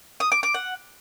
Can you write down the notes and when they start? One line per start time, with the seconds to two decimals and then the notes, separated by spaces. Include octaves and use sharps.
0.20 D#6
0.32 D6
0.43 D6
0.54 F#5